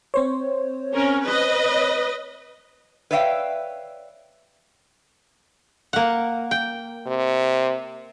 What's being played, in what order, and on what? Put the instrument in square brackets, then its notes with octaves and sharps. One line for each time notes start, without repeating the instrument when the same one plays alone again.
[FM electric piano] C4 C5 C#5
[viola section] C#4 A#4
B4 D#5
[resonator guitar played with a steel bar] B4 C#5 D5 E5 F5 G5
[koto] A#3 F#5
G5
[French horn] C3